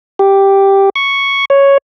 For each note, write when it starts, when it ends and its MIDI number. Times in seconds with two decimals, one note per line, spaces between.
0.19 0.90 67
0.96 1.45 85
1.50 1.78 73